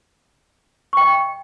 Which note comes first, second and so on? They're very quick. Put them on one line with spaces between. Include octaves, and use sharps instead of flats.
C#6 G5 D#5